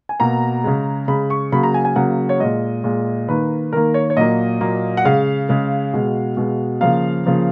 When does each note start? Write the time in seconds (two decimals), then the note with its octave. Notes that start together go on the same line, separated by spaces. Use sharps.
0.09 G#5
0.20 B2 A#3 A#5
0.64 C#3 G#3
1.08 C#3 G#3 B5
1.30 C#6
1.52 C#3 F#3 A#3 B5
1.63 A#5
1.74 G#5
1.85 G#5
1.96 C#3 F#3 A#3 F#5
2.29 C#5
2.40 A#2 G#3 D#5
2.84 A#2 G#3
3.28 D#3 A#3 B4
3.73 D#3 A#3 A#4
3.94 C#5
4.10 C#5
4.17 A#2 F#3 A#3 D#5
4.61 A#2 F#3 A#3
4.97 F#5
5.04 C#3 G#3 F5
5.49 C#3 G#3
5.93 B2 G#3
6.37 B2 G#3
6.81 C#3 F3 A#3 F5
7.25 C#3 F3 A#3